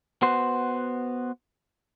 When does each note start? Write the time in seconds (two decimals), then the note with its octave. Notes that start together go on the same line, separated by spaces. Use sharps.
0.22 B3 F#4 C5